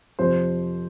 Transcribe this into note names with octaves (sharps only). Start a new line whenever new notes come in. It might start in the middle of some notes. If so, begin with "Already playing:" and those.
F2 C3 F3 C5